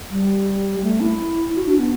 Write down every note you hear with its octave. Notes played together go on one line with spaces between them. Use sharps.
G3
A3
E4
F#4
D4
B3